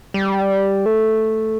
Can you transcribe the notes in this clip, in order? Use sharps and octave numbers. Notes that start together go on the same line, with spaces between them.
G3
A3